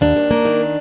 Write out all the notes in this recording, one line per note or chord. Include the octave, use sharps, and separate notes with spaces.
D#2 D4
D#2
A#3
D#3